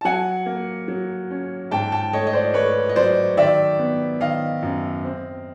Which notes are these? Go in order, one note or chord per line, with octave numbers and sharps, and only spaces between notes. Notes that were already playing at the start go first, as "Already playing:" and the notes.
A5
F#3 F#5 G#5
A#3
F#3
C#4
G#2 G5 A5
G5 A5
A3 C#5 D#5
D#5
C5 D5
A3 B4 C#5
D#5
F#3 C5 D5
D#3 D5 E5
B3
D#3 D#5 F5
F#2
C4